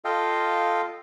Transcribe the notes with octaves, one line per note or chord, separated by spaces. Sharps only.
F4 A4 D#5 F5 G5